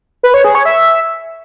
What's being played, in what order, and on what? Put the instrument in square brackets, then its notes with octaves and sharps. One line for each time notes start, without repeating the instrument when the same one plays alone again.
[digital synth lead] B4
C#5
G#4
C#5
E5